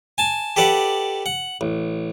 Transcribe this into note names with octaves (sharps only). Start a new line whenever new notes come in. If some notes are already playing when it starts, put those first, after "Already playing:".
G#5 A5
G4 A4 B4 D5 F#5
F#5
A1